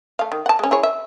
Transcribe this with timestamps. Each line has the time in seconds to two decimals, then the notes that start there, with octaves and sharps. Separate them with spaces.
0.19 A3 F5
0.32 D#3
0.46 F#5 A5
0.59 G#3 C#4
0.71 E4 G#4 C#5
0.83 E5